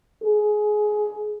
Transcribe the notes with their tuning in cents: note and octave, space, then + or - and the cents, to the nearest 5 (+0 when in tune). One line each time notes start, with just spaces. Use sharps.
G#4 +20